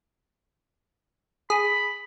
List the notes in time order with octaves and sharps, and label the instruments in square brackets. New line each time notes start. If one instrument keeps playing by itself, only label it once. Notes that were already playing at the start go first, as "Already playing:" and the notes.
[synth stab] G#4 [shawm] B5